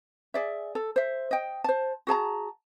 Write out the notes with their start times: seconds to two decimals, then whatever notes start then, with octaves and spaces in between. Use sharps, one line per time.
0.34 G#4 D5 E5
0.75 A4
0.96 C5 E5
1.31 D#5 G5
1.64 C5 A5
2.07 F#4 G#4 A5 A#5